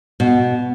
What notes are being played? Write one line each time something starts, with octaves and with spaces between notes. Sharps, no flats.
B2